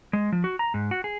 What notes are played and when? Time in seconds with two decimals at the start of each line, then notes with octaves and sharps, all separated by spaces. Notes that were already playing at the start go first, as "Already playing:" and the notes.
0.13 G#3
0.32 F3
0.44 F#4
0.59 A#5
0.74 G#2
0.91 F#4
1.04 G#4